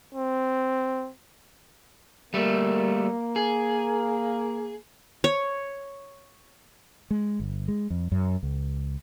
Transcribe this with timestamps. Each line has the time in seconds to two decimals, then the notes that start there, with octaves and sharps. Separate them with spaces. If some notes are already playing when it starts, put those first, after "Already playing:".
0.15 C4
2.34 G3 A3 A#3
3.36 G#4
5.24 C#5
7.11 G#3
7.40 G1
7.68 G#3
7.90 F2
8.12 F#2
8.43 C#2